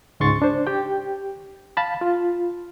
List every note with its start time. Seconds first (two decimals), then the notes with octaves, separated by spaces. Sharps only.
0.20 C#2 G#2 G#3 C6 C#6 A6
0.42 D4 C5
0.67 G4 G5
1.77 F5 A5 B5
2.01 F4